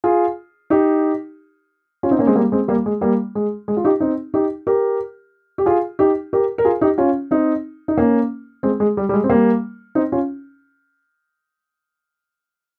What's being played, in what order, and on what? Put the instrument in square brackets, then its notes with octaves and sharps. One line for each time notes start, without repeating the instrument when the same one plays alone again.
[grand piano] F4 G#4
D#4 G4
C#4 F4
C4 D#4
A#3 C#4
G#3 C4
G3 A#3
G#3 C4
G3 A#3
G#3
G3 A#3
G#3
G#3
F4
D#4 G4
C4 D#4
D#4 G4
G4 A#4
G4
F4 G#4
D#4 G4
G4 A#4
A#4
F4 G#4
D#4 G4
C#4 F4
C4 D#4
D#4
A#3 C#4
G#3 C4
G#3
G3
G3
G#3
C4
G3 A#3
C4 D#4
C#4 F4